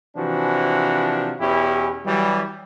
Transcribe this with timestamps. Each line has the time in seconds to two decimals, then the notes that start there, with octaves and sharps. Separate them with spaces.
0.16 C3 E3 F3 D4 F#4
1.39 E2 B2 C#4 E4 G4
2.05 E3 F#3 G3